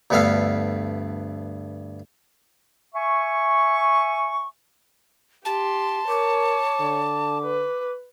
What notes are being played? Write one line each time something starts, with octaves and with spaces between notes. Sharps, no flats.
D2 G2 B3 A4 E5 F5
E5 G#5 C#6
G4 A5 C6
A#4 C#5 D6
D3
B4